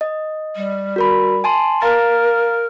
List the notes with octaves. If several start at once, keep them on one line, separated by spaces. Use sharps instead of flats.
D#5
G3
F#4 A#4 B5
G#5 A5 C6
A#4 F5 A#5 A6